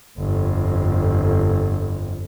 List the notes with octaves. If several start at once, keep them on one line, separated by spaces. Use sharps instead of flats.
G1 F2